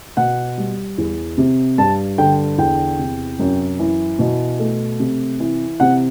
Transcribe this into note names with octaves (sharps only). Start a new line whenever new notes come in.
B2 F#5
G3
E2
C3
G2 A5
D3 G5
E2 G5
C3
F#2
E3
B2
A3
C3
E3
C3 F#5